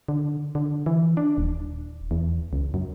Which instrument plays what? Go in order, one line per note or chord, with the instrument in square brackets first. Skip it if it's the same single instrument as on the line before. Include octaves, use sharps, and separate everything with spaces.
[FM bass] D3
D3
E3
D4
D#1
E2
C#2
F#2